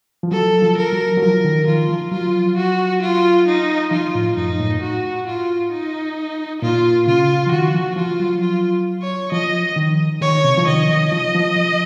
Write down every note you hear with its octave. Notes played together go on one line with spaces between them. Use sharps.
F3
F#3 A4
F3
A#4
F#3
F#3
F3 A#4
D#3
D#3 F4
F3
F#3 F4
F#4
F4
D#4
F3 F4
A2
F#2 D#4
A2
F#4
F4
D#4
A#2 F4
C#3 F4
F3
D#3 F#4
F3
F3 F4
F#3
F4
C#5
F3 D#5
D#3
D#3 C#5
C3
F3
D#3 D#5
D#3
F3
F3
F3